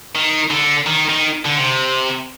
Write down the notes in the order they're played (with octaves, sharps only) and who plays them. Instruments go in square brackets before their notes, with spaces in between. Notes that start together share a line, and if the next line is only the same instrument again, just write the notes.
[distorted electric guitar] D#3
D3
D#3
D#3
D3
C3